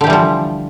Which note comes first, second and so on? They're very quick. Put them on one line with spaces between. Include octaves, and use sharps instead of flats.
D3 G4 E3 G3 F3